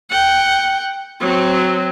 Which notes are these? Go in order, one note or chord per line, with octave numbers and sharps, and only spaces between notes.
F#5 G5
F#3 C4